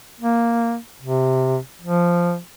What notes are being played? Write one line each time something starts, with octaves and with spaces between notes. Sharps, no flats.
A#3
C3
F3